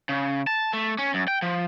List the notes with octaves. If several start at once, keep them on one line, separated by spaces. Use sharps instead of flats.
C#3
A5
A3
C#4
F#2
G5
F3